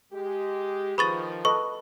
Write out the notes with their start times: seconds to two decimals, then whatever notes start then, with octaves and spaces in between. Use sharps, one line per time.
0.13 G#3 G4
0.98 D#3 F3 G#4 B4 B5 C#6 D#6 A6
1.45 A4 B4 D#5 C#6